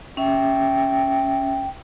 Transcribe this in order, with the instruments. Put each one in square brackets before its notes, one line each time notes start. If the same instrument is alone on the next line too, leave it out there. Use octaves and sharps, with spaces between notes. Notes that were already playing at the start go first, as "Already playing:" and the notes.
[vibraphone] C#4 E5 [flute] G5